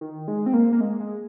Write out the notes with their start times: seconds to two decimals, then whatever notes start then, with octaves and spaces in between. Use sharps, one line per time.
0.01 D#3
0.28 G#3
0.46 C4
0.54 A#3
0.73 A#3
0.80 G#3
1.00 G#3